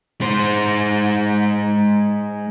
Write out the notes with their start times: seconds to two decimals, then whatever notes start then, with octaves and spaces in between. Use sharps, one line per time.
0.21 G#3 C5